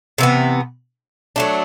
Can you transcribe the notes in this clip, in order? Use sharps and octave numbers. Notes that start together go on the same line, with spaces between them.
C3 E3 B3
F#3 A3 D4